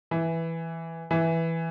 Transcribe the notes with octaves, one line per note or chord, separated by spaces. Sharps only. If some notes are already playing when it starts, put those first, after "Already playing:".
E3
E3